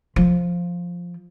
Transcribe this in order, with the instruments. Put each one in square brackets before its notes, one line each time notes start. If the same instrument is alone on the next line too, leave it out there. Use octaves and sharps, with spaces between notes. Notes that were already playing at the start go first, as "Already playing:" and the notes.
[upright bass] F3